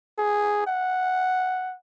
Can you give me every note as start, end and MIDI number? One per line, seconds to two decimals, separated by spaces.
0.18 0.66 68
0.67 1.75 78